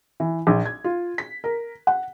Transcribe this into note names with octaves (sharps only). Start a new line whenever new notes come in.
E3
A#1
G#6
F4
B6
A#4
F#5